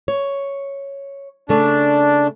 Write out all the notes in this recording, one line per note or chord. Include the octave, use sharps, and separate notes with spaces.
C#5
C#3 A3 D4